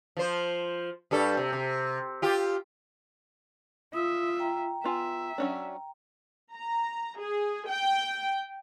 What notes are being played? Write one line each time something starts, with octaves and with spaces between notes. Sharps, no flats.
F3 C5
G2 G3 A4
C3
C3
F4 G4
F4 E5 D#6 E6
G5 A#5
B3 F4 E5 G#5
F#3 C#4 D4
A#5
G#4
G5